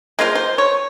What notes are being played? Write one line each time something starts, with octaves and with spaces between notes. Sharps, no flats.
G#3 A#3 F4 C5
C5
C#5